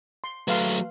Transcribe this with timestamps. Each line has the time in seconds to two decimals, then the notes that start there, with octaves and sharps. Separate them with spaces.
0.24 C6
0.48 F#3 A3 B4 F5 C6